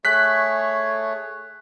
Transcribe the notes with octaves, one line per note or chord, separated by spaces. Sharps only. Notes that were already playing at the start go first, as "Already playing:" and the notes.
A3 G#4 C#5 F#6 B6